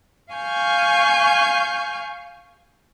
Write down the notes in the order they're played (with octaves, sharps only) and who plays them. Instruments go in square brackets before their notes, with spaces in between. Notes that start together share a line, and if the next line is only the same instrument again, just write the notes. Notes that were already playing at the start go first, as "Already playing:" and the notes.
[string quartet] F5 G#5 C#6 F6 G6